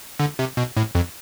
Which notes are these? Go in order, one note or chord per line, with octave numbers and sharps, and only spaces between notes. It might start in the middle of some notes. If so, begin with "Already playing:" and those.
D3
C3
B2
A2
F2